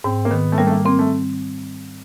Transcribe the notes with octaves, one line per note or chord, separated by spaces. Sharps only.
G#2 C4
A#3
D#3 B3
A3
G3 A#3
A3
A#3
A#3 C4
A3